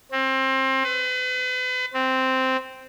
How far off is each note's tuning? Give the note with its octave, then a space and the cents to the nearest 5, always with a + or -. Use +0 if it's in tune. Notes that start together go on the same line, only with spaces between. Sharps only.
C4 +25
B4 +40
C4 -5